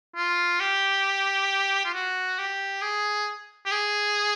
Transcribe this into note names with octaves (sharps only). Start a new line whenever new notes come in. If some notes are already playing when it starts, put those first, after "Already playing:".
F4
G4
F4
F#4
G4
G#4
G4
G#4